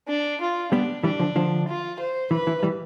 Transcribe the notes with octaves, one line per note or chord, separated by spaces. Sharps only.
D4
F4
G3 B3 D4
E3 G3 D4
D3 F3
D3 F3
F4
C5
E3 B4
E3
E3 G3